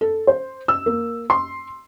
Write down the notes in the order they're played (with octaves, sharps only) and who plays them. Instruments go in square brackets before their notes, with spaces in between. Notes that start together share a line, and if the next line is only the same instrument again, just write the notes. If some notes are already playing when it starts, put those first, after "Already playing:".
[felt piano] A4
C5
E6
A#3
C6